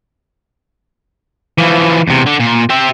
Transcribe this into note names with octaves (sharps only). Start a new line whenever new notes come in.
E3 F3
E2 C3
D3
A#2
G4 E5